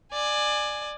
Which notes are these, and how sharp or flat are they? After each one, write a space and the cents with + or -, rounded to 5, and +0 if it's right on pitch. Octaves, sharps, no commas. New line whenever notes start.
D5 +20 G#5 +0